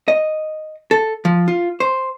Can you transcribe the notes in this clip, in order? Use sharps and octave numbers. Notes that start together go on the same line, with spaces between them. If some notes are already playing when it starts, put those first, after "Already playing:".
D#5
A4
F3
F4
C5